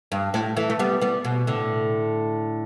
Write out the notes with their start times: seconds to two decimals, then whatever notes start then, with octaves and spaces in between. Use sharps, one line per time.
0.12 G2
0.34 A2
0.57 E3 A3
0.70 A3
0.79 G3 B3
1.01 G3 B3
1.25 B2
1.47 A2 D3